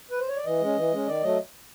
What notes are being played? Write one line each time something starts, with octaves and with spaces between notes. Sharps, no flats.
B4
C5
C#5
D5
E3 D#5
G#3 C#4
E3
G#3 C#4
D#3 D5
F#3 A3 D#5